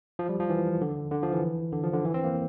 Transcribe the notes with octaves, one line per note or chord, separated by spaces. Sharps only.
F3
G3
F3
E3
D3
D3
F3
E3
D3
F3
D3
E3
C4
A#3